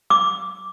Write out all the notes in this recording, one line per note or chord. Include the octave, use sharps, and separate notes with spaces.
D6